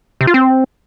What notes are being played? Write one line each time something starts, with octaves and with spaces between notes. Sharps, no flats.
C3
F4
C4